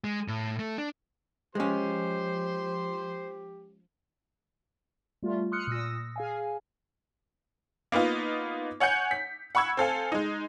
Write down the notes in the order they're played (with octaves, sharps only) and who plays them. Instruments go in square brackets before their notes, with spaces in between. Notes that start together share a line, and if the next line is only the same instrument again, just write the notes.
[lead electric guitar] G#3
A2
A3
D4
[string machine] F3 [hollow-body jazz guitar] G#3 C#4 [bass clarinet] G4 [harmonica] C5 C6
[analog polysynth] G3 A3 F4
C6 D#6 F6 F#6 C#7
A#2 D#6 E6 A#6
G#4 F5 G#5
[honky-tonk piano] A#3 B3 D#4 F4
C#5 F#5 G#5 G6 C#7
B6
F#5 B5 C#6 E6 G#6
C4 A4 F5 G#5
G#3 D#4